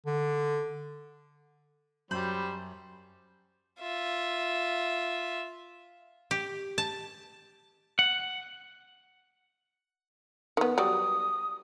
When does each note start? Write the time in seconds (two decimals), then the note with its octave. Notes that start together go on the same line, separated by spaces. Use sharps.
0.06 D3
2.11 F#2 G3 C5 B5 G6
3.80 F4 E5
6.31 G4
6.78 A5
7.99 F#5
10.57 D#3 B3
10.78 F#3 G3 D#6